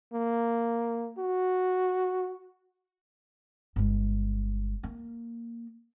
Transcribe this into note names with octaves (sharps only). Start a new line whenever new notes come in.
A#3
F#4
G1 G#3
A#3